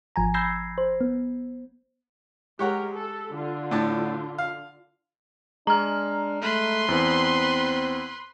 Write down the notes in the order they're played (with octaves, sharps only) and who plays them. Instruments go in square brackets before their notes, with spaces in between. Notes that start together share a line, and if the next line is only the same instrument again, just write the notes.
[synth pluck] G#1 F3 G#5 A#5
B5 E6 G6 G#6 A#6 C7
C5
B3
[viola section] G#3 A#4 [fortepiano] G4 C#5 F#5
[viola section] A4
D3 F4
[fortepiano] A2 D4 A5
F5
[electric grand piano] G#3 [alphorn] D4 [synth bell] A#5 F6
[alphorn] A3 [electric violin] B4 C6
[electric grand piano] E2 B3 [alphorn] C4